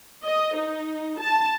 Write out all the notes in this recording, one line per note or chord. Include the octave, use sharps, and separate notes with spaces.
D#5
D#4
A5